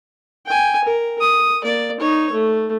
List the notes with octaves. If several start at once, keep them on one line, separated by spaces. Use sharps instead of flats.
G5 G#5
A#4
D#6
A#3 D5
D#4 C#5
A3